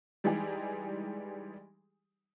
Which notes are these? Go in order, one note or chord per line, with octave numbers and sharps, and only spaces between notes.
E3 G3 G#3 D#4 G4 G#4